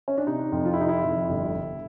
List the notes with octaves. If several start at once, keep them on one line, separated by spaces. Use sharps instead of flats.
C#4
D4
C3 D#4
F2
F4
E4
C3 D#4
E4
F2
G1
G1